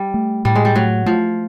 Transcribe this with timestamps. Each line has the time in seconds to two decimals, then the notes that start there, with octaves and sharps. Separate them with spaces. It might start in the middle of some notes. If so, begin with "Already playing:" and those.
Already playing: G3
0.14 A3
0.45 A2 G3
0.55 G#3
0.65 G3
0.75 F#3 A3
1.06 F3 A3